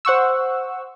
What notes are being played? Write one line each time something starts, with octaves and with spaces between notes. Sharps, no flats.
C5 F#5 C#6 E6